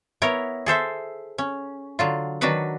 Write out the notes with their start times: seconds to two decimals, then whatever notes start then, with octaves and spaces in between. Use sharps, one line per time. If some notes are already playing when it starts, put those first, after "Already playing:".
0.22 B3 E4 A#4 C#5
0.66 G#4 A4 C5 E5
1.38 C#4
1.99 D3 F#3 F4
2.41 D#3 F#3 D4 F#4 B4 F#5